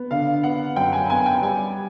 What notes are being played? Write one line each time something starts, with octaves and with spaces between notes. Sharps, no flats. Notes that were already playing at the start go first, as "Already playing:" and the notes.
Already playing: B3
D3 F5
B3 F#5
F#2 G5
G#5
B3 G#5
G5
G3 G#5